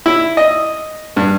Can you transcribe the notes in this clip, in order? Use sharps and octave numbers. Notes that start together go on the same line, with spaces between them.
E4
D#5
G2